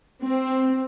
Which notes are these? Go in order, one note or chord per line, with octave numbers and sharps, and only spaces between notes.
C4